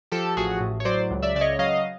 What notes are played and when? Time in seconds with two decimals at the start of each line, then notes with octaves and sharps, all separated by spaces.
0.12 F3 G4 A4
0.37 A1 F#4 G#4
0.61 A2
0.80 C#5
0.85 F#3 C5 D5
1.11 C#2
1.22 D5 E5
1.35 C#3 D5
1.41 C#5 D#5
1.59 F#3 D#5 F5